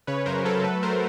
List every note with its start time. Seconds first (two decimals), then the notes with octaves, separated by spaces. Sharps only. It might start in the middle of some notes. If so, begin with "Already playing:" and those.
0.07 C#3 B4 C#5
0.26 F#2 A#4 C5
0.45 F#3 A4 B4
0.64 A3 A4 B4
0.83 A3 A#4 C5